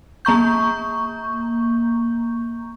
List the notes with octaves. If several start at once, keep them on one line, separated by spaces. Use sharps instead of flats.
A#3 A#5 C#6 G6